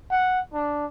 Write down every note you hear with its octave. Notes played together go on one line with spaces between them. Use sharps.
F#5
D4